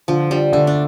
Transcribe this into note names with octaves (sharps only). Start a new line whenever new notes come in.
D3 F3
G3 D4
D3 A3
D4